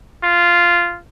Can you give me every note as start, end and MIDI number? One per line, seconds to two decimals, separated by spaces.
0.23 0.99 65